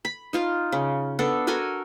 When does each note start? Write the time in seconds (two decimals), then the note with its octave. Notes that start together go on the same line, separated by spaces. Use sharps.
0.05 B5
0.33 D#4 F4 F5
0.72 C#3
1.19 B3 D4 A4
1.47 F#4 A4 A#4 G#5